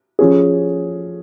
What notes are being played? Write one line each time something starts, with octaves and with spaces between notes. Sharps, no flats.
F3 C#4 G#4